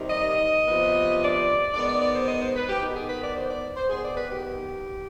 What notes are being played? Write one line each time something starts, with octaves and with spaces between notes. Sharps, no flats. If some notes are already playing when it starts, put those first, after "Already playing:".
Already playing: C3 D#3 G3
D#5
C3 F3 B3
D5
D#3 G#3 B3 D5
D5
D5
C5
D#5
C5
B4
G4
D#3 B3 D#4
G#4
B4
D5
C5
D5
C5
D#3 B3 G#4
D5
B4
G4